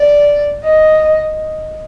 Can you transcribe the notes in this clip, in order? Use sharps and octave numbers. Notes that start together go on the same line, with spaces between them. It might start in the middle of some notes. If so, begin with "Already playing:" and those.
Already playing: D5
D#5